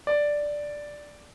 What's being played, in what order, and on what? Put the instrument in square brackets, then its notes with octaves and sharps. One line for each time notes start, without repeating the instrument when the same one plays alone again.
[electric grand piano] D5